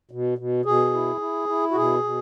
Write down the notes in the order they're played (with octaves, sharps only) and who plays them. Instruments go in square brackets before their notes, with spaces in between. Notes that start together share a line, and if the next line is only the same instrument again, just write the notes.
[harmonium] B2
B2
B2 G#4
E4
E4
E4
F#4
B2 G#4
B2